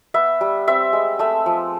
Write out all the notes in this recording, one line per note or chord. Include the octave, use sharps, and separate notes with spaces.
B3 E5
G3
C4 E5
G#3
A3 E5
F3